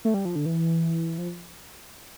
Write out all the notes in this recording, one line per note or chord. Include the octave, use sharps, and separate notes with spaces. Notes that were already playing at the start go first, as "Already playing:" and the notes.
A3
G3
F3
D3
E3
F3